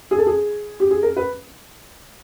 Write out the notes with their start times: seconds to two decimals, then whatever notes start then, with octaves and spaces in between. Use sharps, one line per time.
0.11 G#4
0.19 A4
0.27 G#4
0.80 G4
0.91 G#4
1.03 A#4
1.17 B4